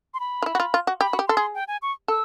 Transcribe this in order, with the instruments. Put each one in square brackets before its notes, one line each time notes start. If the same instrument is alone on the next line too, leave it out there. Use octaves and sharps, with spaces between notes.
[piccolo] C6
B5
[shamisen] F4
E4
F#4
F4
F4
F#4
[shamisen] G4 [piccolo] B5
[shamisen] F#4
G4
[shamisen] A4 [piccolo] C6
[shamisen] G#4
[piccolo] G5
G#5
C#6
[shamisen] A4 [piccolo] E6